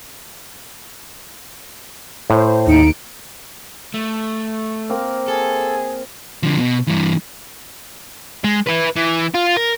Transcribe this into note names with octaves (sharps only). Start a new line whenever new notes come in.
A2 C5
D#2 D#4 C#7 D7
A3
A#3 C4 F5
G#4 A4
D3 F3
B2
G2 E3
G#3
E4 B4
E3
F4
A#4